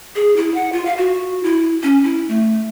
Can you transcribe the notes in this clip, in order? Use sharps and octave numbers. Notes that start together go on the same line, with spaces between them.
G#4
E4
F#5
F4
F5
F#4
E4
C#4
E4
A3